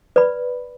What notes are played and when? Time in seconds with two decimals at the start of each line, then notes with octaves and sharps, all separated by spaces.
0.16 B4 D5 B5